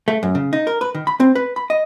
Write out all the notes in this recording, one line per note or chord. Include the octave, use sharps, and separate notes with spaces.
A3
F#2
C#3
D#4
A#4
B4
D#3
B5
C4
B4
B5
D#5